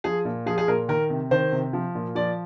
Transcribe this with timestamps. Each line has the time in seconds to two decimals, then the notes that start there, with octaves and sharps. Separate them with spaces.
0.04 F3 G#4
0.25 A#2
0.46 F3 G#4
0.58 G#4
0.68 A#2 A#4
0.89 D#3 A#4
1.10 C3
1.31 D#3 C5
1.52 C3
1.73 F3
1.95 A#2
2.15 F3 D5